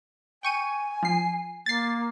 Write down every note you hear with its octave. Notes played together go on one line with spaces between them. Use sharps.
G5 G#5 C#6 D#7
F3 C7
A#3 A6 C7